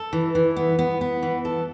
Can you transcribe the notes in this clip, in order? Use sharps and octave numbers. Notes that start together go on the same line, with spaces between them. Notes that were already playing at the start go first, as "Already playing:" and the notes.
Already playing: A4
E3
E3
B3
B3
B3
E3
A4